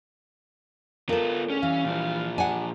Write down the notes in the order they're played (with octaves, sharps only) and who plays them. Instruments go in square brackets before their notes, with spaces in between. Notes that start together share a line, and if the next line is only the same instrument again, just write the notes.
[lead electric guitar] B3 F4 [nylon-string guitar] A4 A#4
[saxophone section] A2 D3 G#4 [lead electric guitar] C#4
[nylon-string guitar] E3 [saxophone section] G3 F5
[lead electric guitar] A#2 F3
[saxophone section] G3 D4 [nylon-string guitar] F#5 G#5